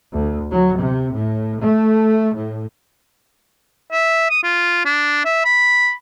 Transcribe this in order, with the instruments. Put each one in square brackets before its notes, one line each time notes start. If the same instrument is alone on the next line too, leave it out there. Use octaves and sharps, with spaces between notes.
[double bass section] D2
F#3
C3
A2
A3
A2
[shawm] E5
D#6
F4
D4
E5
B5